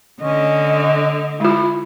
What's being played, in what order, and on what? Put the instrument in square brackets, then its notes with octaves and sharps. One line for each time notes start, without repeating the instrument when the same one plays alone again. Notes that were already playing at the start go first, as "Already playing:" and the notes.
[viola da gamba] D3 [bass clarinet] C#4 [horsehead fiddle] D#5
[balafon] G#3 F4 [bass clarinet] E4